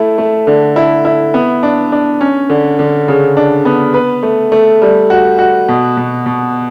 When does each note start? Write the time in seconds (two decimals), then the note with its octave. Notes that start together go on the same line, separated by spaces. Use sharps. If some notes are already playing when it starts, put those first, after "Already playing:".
Already playing: A3 E4
0.18 A3
0.47 D3
0.76 E4
1.05 E4
1.34 B3
1.63 D4
1.92 D4
2.21 C#4
2.49 D3
2.79 D3
3.08 C#3
3.37 D4
3.65 B3
3.94 B4
4.23 A3
4.52 A3
4.82 G3
5.10 F#4
5.39 F#4
5.68 B2
5.97 B2
6.26 B2